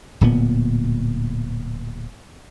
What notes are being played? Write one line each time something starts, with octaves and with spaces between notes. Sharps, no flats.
D1 A#2 B3